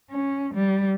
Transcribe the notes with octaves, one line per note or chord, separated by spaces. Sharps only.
C#4
G3